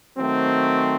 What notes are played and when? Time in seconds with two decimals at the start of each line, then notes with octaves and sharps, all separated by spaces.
0.17 D#3 F#3 A3 C4